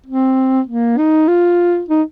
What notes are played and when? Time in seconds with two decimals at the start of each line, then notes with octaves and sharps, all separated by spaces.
0.06 C4
0.67 A#3
0.98 D#4
1.28 F4
1.89 D#4